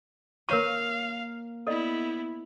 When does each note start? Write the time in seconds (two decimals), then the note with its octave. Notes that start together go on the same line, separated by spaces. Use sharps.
0.49 A#3 A#4 C#5 F5 C#6 D#7
1.67 B3 E4 A4 D5 D#5